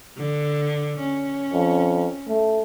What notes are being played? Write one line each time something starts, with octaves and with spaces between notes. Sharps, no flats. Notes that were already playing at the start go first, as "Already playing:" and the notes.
D3
C#4
F2
A3